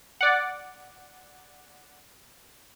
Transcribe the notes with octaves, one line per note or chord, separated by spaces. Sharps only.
D5 F#5